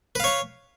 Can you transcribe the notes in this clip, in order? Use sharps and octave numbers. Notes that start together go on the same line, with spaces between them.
B4 C#5 F5